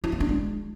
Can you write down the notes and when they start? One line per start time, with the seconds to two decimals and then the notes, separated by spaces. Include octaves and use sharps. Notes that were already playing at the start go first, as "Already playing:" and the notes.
0.04 E4
0.12 B3
0.20 D4
0.29 G#3